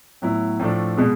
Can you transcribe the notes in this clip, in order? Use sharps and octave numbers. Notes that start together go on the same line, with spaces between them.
A2 F#3 B3 E4
A2 F3 A3 D4
B2 G#3 B3